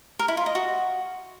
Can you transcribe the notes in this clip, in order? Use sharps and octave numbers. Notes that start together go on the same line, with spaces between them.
A#4
E4
F4
D#5
F#4